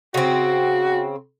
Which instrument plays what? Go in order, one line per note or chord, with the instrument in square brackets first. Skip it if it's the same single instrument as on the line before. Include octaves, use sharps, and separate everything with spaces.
[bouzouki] C#3 C4 [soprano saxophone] F#4